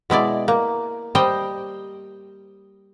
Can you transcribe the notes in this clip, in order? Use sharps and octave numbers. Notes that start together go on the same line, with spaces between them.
B2 G#3 E4 D5
A#3
G3 C5 D#5 G5